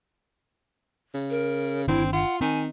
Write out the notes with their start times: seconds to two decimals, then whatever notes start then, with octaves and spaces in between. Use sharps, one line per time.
1.14 C#3
1.30 A#4
1.88 G1 D#3 C4 D4 E4
2.13 F4 F#5
2.41 D#3 C4 G#5